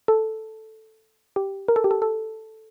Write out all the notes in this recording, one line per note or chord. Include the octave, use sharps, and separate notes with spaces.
A4
G4
A#4
A4
G4
A4
A4